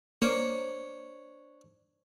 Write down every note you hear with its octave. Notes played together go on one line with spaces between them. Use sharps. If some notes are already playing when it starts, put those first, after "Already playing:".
A#3 D4 C5 C#5